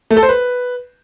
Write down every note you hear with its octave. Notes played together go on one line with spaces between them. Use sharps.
A3
A4
C5
B4